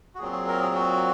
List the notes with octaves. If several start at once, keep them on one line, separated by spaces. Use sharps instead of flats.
F#4
A#2 F#3 C4 G#4
G#4
A#4
G#4
F#4